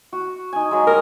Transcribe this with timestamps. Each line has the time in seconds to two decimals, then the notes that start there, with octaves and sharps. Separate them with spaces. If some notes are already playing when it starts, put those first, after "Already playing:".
0.13 F#4
0.53 D#4 G#5
0.71 F#3 G#3
0.87 G3 A#4 D#5 A#5